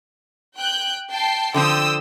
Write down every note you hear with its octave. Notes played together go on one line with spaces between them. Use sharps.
G5 F#6 G6
G5 A5 C7
D3 F3 C4 G5 D#6 E6